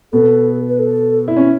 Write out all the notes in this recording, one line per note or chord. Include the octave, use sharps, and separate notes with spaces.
B2 B3 A4
B4
A4
E4
C#4